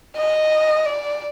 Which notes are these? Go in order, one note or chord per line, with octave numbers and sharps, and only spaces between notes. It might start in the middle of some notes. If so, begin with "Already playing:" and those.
D#5
D5